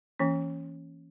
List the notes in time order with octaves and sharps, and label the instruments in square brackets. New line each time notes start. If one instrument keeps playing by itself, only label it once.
[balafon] E3 A#3 C#4